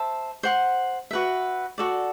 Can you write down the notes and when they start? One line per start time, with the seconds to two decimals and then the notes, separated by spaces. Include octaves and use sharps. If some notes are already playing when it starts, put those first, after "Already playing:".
Already playing: C5 E5 A5
0.43 C5 F#5 C6
1.11 F#4 B4 E5
1.78 F#4 A4 D5